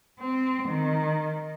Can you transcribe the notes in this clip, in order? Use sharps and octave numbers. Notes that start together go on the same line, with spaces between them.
C4
D#3